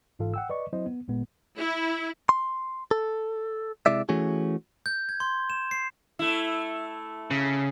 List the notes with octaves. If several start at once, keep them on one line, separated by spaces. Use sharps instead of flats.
G1 G#2 E3 F4 A4 F5
F#5 G5 E6
B4 D5 D#5 C#6
F#3 C4 E4 C5 D#5
B3
G#1 A#2 G#3 B3
E4
C6
A4
C3 G#3 E4 D5 E5
E3 A3 C#4 F#4 G#4
G6
G#6
C6
E7
C7
A3 E4
C#3